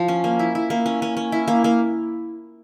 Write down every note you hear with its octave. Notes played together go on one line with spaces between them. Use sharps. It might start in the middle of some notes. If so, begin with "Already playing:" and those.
Already playing: F3
C#4
A#3
E4
E4
A#3
C#4
C#4
C#4
E4
A#3
A#3